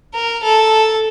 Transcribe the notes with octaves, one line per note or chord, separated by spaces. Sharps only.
A#4
A4